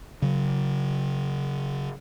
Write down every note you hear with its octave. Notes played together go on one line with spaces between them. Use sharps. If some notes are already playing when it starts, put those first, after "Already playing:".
C#3 F#3